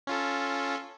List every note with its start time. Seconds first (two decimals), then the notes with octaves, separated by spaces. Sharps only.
0.07 C#4 F4 A4